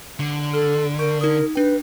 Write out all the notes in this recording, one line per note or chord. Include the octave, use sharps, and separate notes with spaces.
D3
A4 F6
A#4 C#6 G6 D7
D#4 A#4 D#6
D4 B4 G5